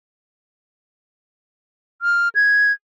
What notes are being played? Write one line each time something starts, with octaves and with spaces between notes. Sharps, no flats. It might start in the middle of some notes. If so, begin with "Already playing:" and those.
F6
G#6